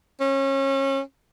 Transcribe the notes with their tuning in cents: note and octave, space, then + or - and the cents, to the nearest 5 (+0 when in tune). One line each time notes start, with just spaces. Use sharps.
C#4 -30